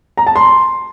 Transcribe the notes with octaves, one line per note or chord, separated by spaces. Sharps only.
A#5
A5
C6